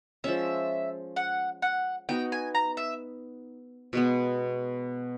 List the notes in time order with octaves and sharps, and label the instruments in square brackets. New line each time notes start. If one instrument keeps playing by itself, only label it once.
[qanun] F3 G#3 C#4 [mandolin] E5
[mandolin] F#5
F#5
[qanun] B3 D#4 F#4 [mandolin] G5
[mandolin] G#5
A#5
E5
[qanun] B2 G#3 B3